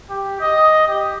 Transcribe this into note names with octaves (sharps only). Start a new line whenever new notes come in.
G4
D#5
G4